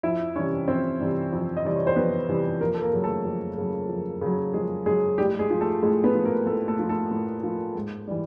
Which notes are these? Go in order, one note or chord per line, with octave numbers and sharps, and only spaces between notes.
F2 E4 E5
C3 E3 G3 C#4 C#5
F2 C4 C5
C3 E3 G3
F2
D#5
C3 E3 G3 D5
C#5
C5
F2 B3 B4
C3 E3 G3
F2 A#3 A#4
A4
A#3 A#4
C#3 F#3
A3 A4
F2
C#3 F#3
F2
C#3 F#3
F2 G#3 G#4
C#3 F#3 G#3 G#4
A2 G3 G4
G#3 G#4
F3
A3 A4
A2 G#3 G#4
B3 B4
F3
A#3 A#4
A2 A3 A4
A3 A4
F3
A3 A4
A2
F3
G#2
E3 G3